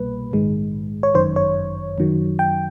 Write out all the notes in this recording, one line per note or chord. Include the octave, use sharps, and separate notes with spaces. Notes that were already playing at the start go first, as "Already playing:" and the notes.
Already playing: C2 B2 G3 A#3 B4
A#1 G#2 D#3 G#3
C#5
G1 F#2 D#3 C5
C#5
F#2 D#3 F#3
G5